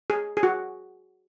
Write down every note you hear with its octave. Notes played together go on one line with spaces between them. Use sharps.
G#4
G#4
F#4